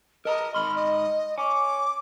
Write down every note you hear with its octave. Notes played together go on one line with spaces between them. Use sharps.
A#4 D#5 A5 A#5
G#2 B5 C6 F6
D#5
C#5 G#5 D6